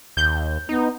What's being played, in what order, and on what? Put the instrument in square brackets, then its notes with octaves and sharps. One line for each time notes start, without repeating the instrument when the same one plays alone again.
[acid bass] D#2 [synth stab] G6
[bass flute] B3 [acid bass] D#4